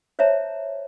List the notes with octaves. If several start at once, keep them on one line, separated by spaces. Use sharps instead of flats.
C5 C#5 E5 A5 A#5